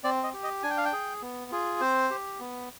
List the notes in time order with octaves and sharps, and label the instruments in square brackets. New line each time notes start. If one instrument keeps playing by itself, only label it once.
[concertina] C4 D5
D#5
G4
D#5
D4 G#5
G5
F5
G5
G#4
B3
F4 G#4
C4 C5
G4
B3